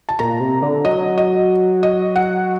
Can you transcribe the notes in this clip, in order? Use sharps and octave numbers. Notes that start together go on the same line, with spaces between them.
A5
A#2 A#5
C3
D3
F#3 D#5
D#5
D#5
F#5